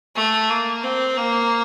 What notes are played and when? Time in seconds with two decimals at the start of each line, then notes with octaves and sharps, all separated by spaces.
0.16 A3
0.49 A#3
0.84 C4
1.17 A#3